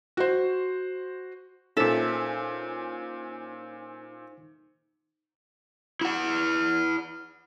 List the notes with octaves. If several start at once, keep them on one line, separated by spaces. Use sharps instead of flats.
F#4 C5
A#2 C#4 D#4 A4 C5 E5
E4 F#5